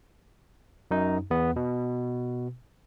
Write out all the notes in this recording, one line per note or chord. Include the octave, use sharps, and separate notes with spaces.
F#2 D#4
E2 B3
B2